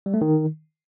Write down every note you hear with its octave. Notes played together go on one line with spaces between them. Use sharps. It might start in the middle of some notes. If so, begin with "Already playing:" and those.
G3
A3
D#3